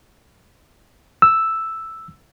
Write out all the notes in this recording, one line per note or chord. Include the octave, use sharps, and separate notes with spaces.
E6